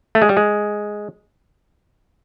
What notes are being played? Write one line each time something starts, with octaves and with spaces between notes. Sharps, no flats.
A3
G#3
G3
G#3